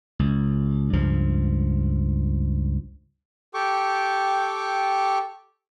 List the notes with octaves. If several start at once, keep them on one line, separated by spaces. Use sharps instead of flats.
C#2
C#2 G2 F3
G4 A4 G5 C#6 D6